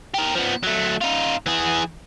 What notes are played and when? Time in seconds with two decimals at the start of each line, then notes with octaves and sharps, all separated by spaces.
0.14 G4 A#4
0.35 F3 B3
0.63 F#3 A3
1.01 D#4 F4
1.46 E3 G#4